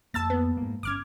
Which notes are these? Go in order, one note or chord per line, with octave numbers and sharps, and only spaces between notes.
F2 A#3 A5 E6 A6
B3
G#2 A#3
G1 C#4 D6 F6 G#6